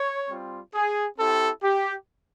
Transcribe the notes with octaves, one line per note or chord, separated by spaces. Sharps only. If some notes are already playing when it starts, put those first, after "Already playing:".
Already playing: C#5
G3 C4 F4
G#4
C4 E4 G4 A4
G4